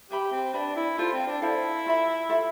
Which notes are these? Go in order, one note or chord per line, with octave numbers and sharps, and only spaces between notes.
G4 B4 E5 B5
C4
D4 B4 E5 B5
E4
F4 A4 C5 F5
C4
D4
E4 A4 C5 F5
F4 A4 E5 B5
F4 A4 E5 B5